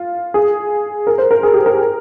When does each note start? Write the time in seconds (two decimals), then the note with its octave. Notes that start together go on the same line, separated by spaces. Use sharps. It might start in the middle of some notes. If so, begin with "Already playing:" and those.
Already playing: F4
0.34 G#4
1.07 A#4
1.18 C5
1.31 A#4
1.43 G#4
1.54 G4
1.66 A#4